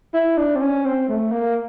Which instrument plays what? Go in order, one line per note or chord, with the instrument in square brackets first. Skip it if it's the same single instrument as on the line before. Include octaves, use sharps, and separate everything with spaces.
[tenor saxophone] E4
D4
C4
C#4
C4
A3
A#3